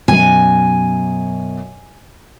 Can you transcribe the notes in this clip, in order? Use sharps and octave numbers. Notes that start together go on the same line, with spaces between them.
F#2 B2 G#5